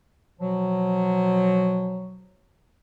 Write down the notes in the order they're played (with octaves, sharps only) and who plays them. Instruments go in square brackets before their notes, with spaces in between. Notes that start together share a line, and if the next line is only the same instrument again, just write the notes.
[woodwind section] B2 F3 F#3